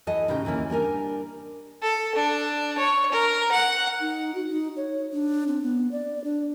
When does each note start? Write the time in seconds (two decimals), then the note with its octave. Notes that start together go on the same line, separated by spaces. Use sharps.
0.07 E2 E3 A4 D#5
0.28 A2 C#3 D#4 G4 G5
0.45 D2 E3 A#3 C#4
0.70 G3 D4 A#4 G#5
1.82 A4
2.15 D4
2.78 C#5
3.12 A#4
3.52 F#5
4.01 D#4
4.35 F#4
4.49 D#4
4.77 C#5
5.13 D4
5.48 C4
5.63 B3
5.92 D5
6.24 D4